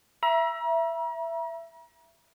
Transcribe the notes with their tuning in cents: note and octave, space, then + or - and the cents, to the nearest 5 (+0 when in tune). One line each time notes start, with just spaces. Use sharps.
E5 +15 A#5 +40